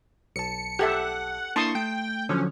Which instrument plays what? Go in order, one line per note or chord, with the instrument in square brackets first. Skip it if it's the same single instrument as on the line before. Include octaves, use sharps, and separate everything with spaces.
[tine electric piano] B1 A5 [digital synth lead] C#7
[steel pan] G4 A4 E5 [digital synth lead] F#5
[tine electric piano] A#3 D4 E4 [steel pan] A5 C6 D#6 [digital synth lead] C#6
[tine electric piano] A3 [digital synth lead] G5
[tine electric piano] D3 F3 F#3 [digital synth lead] C#4